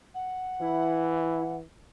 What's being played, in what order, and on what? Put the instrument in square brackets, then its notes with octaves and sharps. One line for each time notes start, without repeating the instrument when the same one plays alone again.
[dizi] F#5
[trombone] E3 [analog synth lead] E4